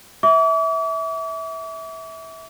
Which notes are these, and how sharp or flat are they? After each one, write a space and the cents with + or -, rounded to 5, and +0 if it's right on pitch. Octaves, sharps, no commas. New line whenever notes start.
E5 -20 D6 -45